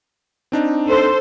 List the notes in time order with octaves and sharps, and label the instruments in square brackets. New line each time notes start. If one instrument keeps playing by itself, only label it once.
[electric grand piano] C4 D4 D#4
[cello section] A4 C5